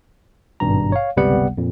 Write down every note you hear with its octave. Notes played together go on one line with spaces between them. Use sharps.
G#1 G2 B2 A#5
C#5 F5
G1 C#2 C3 G3 B3 F#5
F2 A#2